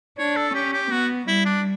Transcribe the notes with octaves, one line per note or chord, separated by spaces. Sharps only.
D4 C#5
A4
C#4 G4
G4
B3 F#4
G3 E4
D4